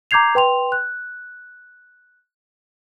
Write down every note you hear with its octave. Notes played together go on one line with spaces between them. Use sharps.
A#5 D6 G6 G#6 C7 F7
B4 G5 C6 F7
F#6